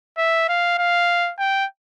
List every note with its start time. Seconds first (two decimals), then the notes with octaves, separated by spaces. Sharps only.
0.18 E5
0.49 F5
0.78 F5
1.39 G5